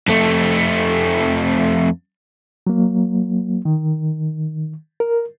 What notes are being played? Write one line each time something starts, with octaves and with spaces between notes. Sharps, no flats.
F2 A3
F#3 A#3
D#3
A#4